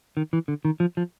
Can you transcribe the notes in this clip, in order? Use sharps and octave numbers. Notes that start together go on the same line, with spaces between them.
D#3
E3
D3
D#3
F3
F3